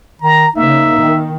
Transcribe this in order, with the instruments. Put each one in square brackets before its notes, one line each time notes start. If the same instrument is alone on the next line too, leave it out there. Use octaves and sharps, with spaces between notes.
[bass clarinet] D#3 [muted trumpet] A#5
[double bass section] C#3 A#3 [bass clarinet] D#4 [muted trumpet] E5
[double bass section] D#3